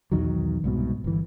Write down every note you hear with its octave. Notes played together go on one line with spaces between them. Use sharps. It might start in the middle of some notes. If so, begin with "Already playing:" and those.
B1 E2 D#3 F#3
C2 G#2 B2
G1 E3